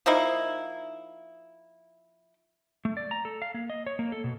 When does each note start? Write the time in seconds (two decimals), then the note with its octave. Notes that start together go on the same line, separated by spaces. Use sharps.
0.06 F3 A#3 D#4 E4
2.85 A3
2.97 D5
3.11 A#5
3.25 A4
3.42 F5
3.54 A#3
3.70 D#5
3.87 C#5
3.99 A#3
4.12 A4
4.24 B2